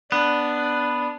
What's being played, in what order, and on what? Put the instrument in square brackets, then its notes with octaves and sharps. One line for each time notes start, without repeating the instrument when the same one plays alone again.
[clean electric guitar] B3 [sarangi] D4